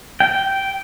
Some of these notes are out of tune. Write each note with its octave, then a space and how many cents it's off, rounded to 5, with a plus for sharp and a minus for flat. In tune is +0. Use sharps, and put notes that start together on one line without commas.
G5 -10